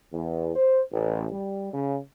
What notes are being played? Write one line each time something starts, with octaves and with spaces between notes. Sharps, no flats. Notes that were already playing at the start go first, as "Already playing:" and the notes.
E2
C5
A1
G3
C#3